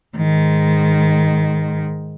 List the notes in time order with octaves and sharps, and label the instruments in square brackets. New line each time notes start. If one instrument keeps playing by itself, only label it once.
[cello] G#2 D#3